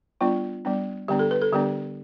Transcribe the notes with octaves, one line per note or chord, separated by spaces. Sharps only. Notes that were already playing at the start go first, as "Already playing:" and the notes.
G3 B3 D4 F4
G3 B3 D4
D3 G3 B3 D4 G4
A4
B4
A4
D3 G3 B3 D4 G4